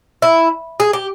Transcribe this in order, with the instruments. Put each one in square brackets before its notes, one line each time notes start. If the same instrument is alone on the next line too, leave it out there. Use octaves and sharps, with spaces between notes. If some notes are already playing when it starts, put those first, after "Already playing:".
[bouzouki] E4
G#4
G4